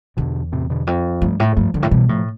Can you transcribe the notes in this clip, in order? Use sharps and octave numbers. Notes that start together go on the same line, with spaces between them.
E2 B2 D3
A2 C3
B2 D3
F2
G2 F3 A3
A2
G2 F3 A3
G2 D3 F3
A2
B2 E3 G3
A2 F3 A3